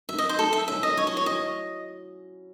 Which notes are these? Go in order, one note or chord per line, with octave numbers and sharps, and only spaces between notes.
F#3 A3 D#4 E5
D#5
C5
F#3 A3 D#4 A4
E5
F#3 A3 C#4 E4 E5
D#5
F#3 A3 C#4 E4 C#5
D#5
C#5
F#3 C#4 E4 D#5